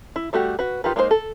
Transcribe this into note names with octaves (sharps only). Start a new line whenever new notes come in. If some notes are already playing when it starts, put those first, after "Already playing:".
E4
G3 A3 F#4 G4
F#4 B4
D#4 F4 G4 A#4 B4
G#3 A#3 D#4 A4 C5
A4